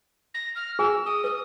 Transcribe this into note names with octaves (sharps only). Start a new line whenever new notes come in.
A#6
F6
G#4 G#5 E6
D#6
B4 D#6